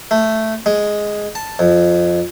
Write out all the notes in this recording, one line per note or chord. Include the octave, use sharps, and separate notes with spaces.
A3
G#3
A5
F2